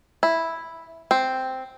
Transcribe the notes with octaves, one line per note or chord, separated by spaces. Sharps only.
E4
C4